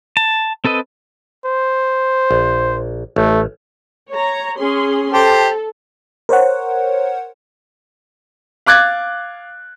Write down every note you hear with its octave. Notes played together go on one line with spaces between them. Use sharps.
A5
C4 A4 B4 D#5
C5
A#1
A1 A3
C#5 A#5
C#4 G#4 C6
G4 A4 C5 A5
A#4 C5 C#5 F#5
F5 D6 F#6 G#6 A6